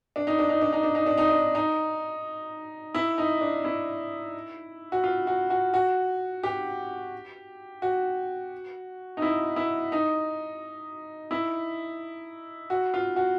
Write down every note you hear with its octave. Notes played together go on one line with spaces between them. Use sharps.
D4
D#4
D4
D#4
D4
D#4
D4
D#4
D4
D#4
D4
D#4
E4
D#4
D4
E4
F#4
F4
F#4
F#4
F#4
G4
F#4
D#4
E4
E4
D#4
E4
F#4
F4
F#4